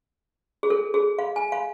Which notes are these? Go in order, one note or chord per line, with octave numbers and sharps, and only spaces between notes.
G#4
A4
G#4
F5
G#5
F5